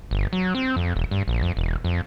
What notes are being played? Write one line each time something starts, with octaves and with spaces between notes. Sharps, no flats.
G1
F#3
C4
F2
E1
G2
A#1
F2
E1
F2